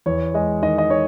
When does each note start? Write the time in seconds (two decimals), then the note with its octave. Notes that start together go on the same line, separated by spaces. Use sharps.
0.06 E2 C#5
0.34 G#3 D#5
0.62 D#3 D#5
0.78 D#5
0.89 D#3 C#5